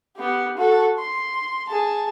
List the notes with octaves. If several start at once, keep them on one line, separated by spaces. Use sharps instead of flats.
B3 G4
F#4 A4
C6
G#4 A5